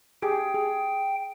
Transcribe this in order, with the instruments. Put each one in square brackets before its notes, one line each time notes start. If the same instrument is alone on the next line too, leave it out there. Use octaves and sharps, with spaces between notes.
[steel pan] G4 G#4 [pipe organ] G5
[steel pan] G#4